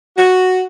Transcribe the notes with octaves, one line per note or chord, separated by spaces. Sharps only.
F#4